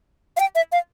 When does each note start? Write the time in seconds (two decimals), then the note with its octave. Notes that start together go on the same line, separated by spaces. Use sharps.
0.37 F5
0.40 G5
0.55 E5
0.72 F5